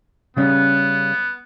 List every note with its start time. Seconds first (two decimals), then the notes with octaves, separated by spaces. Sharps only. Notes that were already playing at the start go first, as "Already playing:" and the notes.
0.37 C#3 G3 B3 C#4